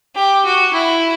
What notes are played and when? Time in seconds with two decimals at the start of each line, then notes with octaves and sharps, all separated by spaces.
0.15 G4
0.45 F#4
0.73 E4